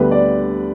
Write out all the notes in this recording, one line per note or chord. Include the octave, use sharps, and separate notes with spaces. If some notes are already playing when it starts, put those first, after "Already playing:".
Already playing: D2 D3 G3 B3 B4
D5